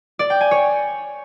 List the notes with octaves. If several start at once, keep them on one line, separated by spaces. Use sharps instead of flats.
D5
G5
G#5
C#5